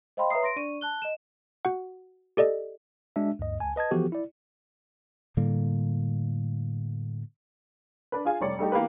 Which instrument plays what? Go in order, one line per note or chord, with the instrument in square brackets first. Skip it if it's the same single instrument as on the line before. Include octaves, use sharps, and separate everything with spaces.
[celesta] C5 D#5 F5 G5 B5 C6
B4 C#5 E5 A#5 D#6 C7
C6 A#6 D7
D4 D5 C#6 D#7
A5 F#6 G7
D#5 E7
[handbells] F#4 F#5
G4 A4 D5 D#5
[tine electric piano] G#3 D4 F#4 E5
D2 G2 D#5
C#2 G#5 A5
B4 D#5 A5 G#6
E3 F3 B3 F#4 G4 A4
E4 D5
[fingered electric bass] A2 D3 G3 A#3
[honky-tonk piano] D4 B4
F4 G#4 F5 G#5
F1 G3 C#5 D5 C#7
G3 A3 D#4 G4
E3 A#3 B3 G4 B4